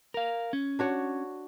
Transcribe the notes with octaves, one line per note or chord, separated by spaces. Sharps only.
A#4 F5
C#4
D4 F#4 C#5